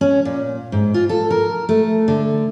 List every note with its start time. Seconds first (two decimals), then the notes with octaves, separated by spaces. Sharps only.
0.01 C#4
0.25 A#2
0.72 G#2
0.94 F4
1.09 A4
1.31 A#4
1.69 A3
2.08 D3